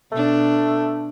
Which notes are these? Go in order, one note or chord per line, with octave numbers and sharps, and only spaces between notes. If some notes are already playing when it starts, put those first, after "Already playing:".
B2 A3 D4